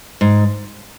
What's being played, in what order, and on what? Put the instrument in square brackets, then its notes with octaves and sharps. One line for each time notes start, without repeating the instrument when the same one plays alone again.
[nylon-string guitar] G#2